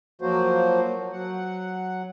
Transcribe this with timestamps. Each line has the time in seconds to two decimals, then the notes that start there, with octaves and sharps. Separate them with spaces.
0.21 F3 F#3 A#3 F#4 C5
1.12 F#3 F#5